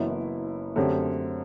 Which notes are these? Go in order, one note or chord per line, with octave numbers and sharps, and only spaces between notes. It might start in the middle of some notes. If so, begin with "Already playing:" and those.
Already playing: F#1 F#2 E3 B3 E4
F#2 D3 A3 C4 G4